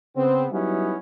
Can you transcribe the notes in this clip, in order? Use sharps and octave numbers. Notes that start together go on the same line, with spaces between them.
C#3 B3 C4
F#3 G3 B3 C#4 D#4 E4